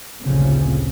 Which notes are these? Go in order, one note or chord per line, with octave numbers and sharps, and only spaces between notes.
A1 D2 A#2 C#3 F3 C4